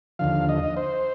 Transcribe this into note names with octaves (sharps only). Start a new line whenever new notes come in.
D#2 D3 F3 F5
D#5
C5